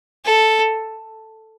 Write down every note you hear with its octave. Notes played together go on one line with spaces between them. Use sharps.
A4